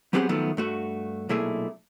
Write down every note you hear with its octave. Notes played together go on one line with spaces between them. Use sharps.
F#3 B3 C4 G4 G#4 F#5
D#3 F3 F#3 A3 B3
G2 A3 F#4
B1 A#2 A3 E4 G#4